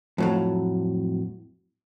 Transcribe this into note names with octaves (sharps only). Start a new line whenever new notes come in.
F2 A2 F#3